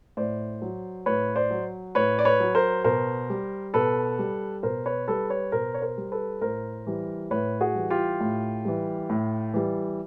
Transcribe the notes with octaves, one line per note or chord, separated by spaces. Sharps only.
A2 C5 D5
F#3
A2 B4 C#5
C5 D5
F#3
A2 B4 C#5
D5
B4 C#5
F#3
A#4 C5
B2 A#4 C5
G3
B2 A4 B4
G3
B2 A#4 C5
B4 C#5
G3 A4 B4
B4 C#5
B2 A#4 C5
C#5
A#4 C5
G3
A4 B4
A2 A#4 C5
E3 G3
A2 B4 C#5
F#4 G#4
E3 G3
F4 G4
A2
E3 G3
A2
E3 G3